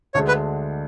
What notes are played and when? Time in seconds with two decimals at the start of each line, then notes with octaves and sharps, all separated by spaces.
0.14 D2 D3 G#3 D4 C#5
0.28 B4